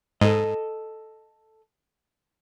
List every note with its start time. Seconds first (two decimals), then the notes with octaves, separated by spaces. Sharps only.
0.22 G#2 A4 D#5